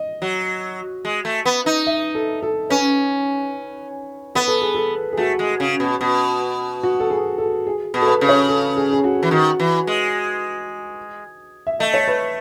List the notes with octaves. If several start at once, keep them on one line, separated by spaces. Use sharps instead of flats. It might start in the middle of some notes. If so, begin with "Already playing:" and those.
Already playing: D#5
F#3
G#3
A3
B3
D#4
E5
A4
A4
C#4 B4
B3 B4
A4
G#4
A4
G#4
A3 F#4
G#3
C#3
B2
B2
F#4
A4
G#4
A4
G#4
B2
A4
B4
C#3
C#5
A4
G#4
G#4
F#4
E3
D#3 F#4
E3
G#3
E5
A3 D#5
C#5
B4